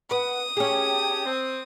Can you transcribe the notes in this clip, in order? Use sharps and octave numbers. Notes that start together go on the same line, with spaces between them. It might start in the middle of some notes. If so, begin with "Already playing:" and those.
B4 F#5 D#6
C#4 G4 G#4 C#5 G5 A5
C4